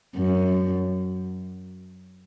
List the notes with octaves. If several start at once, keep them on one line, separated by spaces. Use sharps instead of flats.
F#2